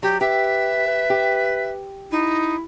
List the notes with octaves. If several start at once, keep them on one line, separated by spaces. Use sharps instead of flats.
F#3 G4
G4 B4 E5
B4
G4
D#4 E4